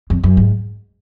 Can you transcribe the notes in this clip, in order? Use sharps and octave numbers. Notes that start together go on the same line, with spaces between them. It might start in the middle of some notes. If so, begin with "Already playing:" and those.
F2
F#2
G#2